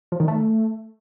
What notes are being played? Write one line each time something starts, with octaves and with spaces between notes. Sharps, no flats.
F3
D#3
A3